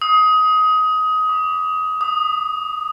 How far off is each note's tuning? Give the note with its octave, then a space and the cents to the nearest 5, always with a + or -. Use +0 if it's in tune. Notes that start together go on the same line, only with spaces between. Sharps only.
D#6 +20
D6 -5
D#6 -15